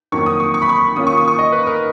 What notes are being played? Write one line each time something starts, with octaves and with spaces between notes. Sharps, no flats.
F2 D#3 F#3 A#3 C#6
D#6
C#6
C#6
B5
C#6
D#3 A#3 C#4 F4 D#6
C#6
D#6
C#6
D#5
B4
A#4